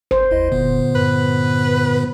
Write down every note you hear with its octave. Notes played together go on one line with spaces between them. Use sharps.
G#1 C5
G1 D#2 E4 D#5
F1 A#2 D3 B3
G2 B4